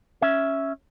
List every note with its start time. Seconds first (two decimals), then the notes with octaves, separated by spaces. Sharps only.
0.22 C#4 E5